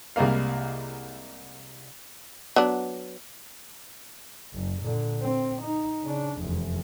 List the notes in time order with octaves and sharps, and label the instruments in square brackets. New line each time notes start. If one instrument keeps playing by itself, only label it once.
[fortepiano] C2 G3 G#3 A#3 F5
[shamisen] F#3 B3 D4
[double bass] F#1
A#2 D3
C4
D#4
C#3 D4
F1 E2